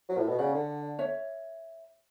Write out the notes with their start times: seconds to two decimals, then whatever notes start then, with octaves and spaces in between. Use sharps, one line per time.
0.09 F#3
0.18 A2
0.29 B2
0.39 C#3 D5 F#5
0.54 D3
0.99 C#5 E5